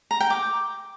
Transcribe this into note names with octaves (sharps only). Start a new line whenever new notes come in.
A#5
G5
D6